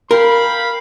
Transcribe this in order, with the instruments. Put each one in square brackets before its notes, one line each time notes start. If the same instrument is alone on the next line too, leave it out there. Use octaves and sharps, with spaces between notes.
[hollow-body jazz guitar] A#4 [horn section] F5 G5 B5